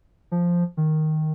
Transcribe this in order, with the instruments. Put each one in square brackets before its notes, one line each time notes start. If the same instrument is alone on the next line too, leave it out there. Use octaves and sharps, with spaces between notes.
[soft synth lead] F3
D#3